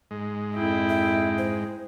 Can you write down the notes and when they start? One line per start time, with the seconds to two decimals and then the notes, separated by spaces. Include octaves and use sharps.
0.11 G#2 G#3
0.55 F2 E4 G5
0.89 E5
1.38 C5